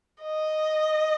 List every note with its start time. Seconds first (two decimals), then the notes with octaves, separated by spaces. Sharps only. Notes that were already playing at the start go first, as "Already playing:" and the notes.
0.23 D#5